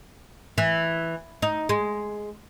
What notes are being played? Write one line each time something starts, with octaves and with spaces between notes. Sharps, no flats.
E3
D#4
G#3